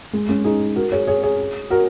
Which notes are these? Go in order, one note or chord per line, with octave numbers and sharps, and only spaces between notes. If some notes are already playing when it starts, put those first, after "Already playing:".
G#3
G#3 C#4
D#4 G#4
F#4 A#4
G#4 C#5
G#4 C#5
G#4 C#5
F#4 A#4